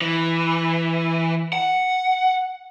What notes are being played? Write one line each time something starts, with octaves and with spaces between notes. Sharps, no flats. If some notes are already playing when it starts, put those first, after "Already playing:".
E3
F#5